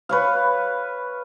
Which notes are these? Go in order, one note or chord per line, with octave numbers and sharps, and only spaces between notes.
B4 C#5 F5